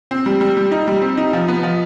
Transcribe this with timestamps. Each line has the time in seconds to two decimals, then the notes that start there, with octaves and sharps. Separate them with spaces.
0.11 C4
0.26 G3
0.41 G3
0.57 G3
0.72 D#4
0.87 G3
1.02 C4
1.17 D#4
1.33 F3
1.48 B3
1.63 F3